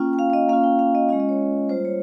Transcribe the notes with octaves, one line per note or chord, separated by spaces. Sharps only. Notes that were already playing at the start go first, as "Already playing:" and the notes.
Already playing: A#3 C#4 F4 G5
G5
F5
F5
D#5
A#3 C#4 F4 F5
G5
F5
D#5
G#3 C#4 F4 D#5
D#5
C#5
G3 A#3 F4 C5
C#5